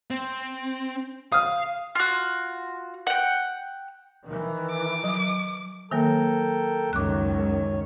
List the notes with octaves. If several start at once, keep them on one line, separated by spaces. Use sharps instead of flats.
C4
F5 D#6 F6
F4 F#4
F#5 G5
D#3 E3
D6
F#3
D#3 F#3 A#3 A4 A#4 G5
C#2 F#2 D#3 C#5 D6 F#6